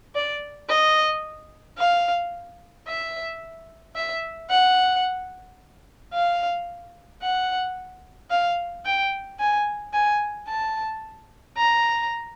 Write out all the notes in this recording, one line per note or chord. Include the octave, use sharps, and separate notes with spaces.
D5
D#5
F5
E5
E5
F#5
F5
F#5
F5
G5
G#5
G#5
A5
A#5